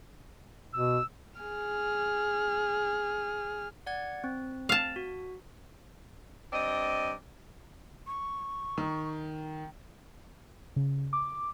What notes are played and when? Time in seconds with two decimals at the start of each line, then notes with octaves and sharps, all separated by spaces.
0.74 B2 E6
1.40 G#4 F6
3.86 D5 F#5 G#6
4.24 C4
4.69 F5 A5
4.96 F#4
6.53 G2 C4 D5 D#5
8.07 C#6
8.78 D#3
10.76 C#3
11.13 D6